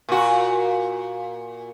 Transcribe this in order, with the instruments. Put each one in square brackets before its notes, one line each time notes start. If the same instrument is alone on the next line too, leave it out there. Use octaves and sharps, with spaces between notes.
[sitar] A#2 F#4